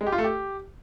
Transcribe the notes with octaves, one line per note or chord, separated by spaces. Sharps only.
G#3
G4
F4
A3
G4